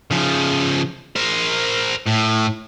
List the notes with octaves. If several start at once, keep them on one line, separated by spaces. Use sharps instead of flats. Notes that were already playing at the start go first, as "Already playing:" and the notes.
C#3 F3
A#4 C5
A2